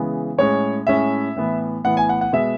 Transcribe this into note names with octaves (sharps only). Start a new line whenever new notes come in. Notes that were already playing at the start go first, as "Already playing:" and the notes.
Already playing: C#3 E3 G#3 B3
A2 G#3 C#4 C#5
A2 G#3 C#4 E5
A2 E3 B3
A2 E3 B3 F#5
G#5
F#5
F#5
B2 G#3 B3 E5